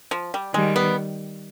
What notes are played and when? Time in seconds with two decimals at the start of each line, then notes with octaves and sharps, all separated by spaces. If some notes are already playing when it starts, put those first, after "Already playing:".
0.11 F3
0.34 G3
0.54 D#3 G3 G#3
0.76 B3